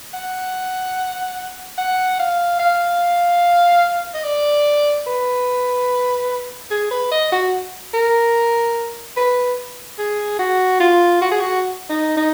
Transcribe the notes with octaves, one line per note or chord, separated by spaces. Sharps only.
F#5
F#5
F5
F5
D#5
D5
B4
G#4
B4
D#5
F#4
A#4
B4
G#4
F#4
F4
F#4
G#4
F#4
D#4
D#4